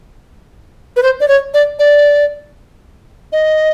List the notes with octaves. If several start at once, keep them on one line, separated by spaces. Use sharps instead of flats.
B4
C5
D5
C#5
D5
D5
D#5